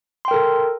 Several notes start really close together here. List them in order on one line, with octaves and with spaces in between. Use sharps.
C6 G5 A#4 A4